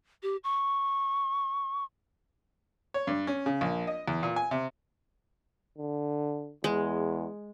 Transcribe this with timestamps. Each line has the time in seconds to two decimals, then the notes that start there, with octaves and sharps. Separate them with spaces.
0.23 G4
0.44 C#6
2.94 C#5
3.07 G2
3.27 C#4
3.46 C#3
3.61 A#1
3.87 D#5
4.08 E2
4.23 A#2
4.36 G#5
4.51 C3
5.78 D3
6.64 E2 G#3